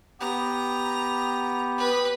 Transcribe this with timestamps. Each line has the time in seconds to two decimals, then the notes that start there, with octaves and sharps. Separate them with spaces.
0.20 B3 G4 A#5
1.78 B4